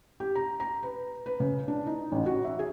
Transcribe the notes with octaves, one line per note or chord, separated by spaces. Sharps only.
G4
A#5
A#5
B4
B4
C#3
D4
D#4
A1
F#4
E5
G#4